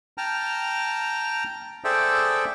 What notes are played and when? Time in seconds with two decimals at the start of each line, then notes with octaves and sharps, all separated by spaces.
0.18 G5 A5 A#5 F6
1.84 G#4 A4 C5 D5 E5 G5